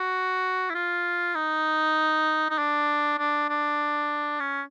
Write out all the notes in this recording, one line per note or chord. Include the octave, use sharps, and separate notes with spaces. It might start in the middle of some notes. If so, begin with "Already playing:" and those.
Already playing: F#4
E4
F4
D#4
D#4
D4
D4
D4
C#4